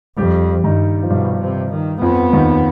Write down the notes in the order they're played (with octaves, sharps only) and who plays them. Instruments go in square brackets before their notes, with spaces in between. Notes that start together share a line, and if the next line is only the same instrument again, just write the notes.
[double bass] F2 [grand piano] G3 G4
[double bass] G2 [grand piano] D#3 D#4
[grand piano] F3
[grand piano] G2 G3 [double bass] B2
[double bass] C3
D#3
[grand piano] F2 F3 [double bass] B3
[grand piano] D#2 D#3